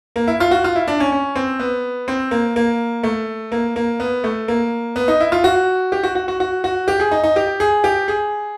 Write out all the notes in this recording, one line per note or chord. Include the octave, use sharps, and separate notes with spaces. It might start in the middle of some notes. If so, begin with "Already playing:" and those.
A#3
E4
F4
F#4
F4
E4
D4
C#4
C#4
C4
B3
C4
A#3
A#3
A3
A#3
A#3
B3
A3
A#3
B3
D#4
E4
F4
F#4
G4
F#4
F#4
F#4
F#4
F#4
G4
G#4
D#4
D#4
G4
G#4
G4
G#4